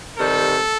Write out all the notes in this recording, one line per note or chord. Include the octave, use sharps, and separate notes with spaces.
C3 D#3 G3 A4